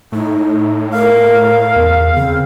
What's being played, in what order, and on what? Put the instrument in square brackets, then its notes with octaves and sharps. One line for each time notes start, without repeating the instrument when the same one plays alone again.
[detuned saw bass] A2 [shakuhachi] D#4
[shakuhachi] A#4 [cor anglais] F5
[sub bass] E2
[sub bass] C#3 [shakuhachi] C4